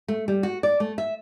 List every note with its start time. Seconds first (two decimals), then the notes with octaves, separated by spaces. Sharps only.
0.08 A3
0.28 G3
0.43 F#4
0.63 D5
0.80 A3
0.98 E5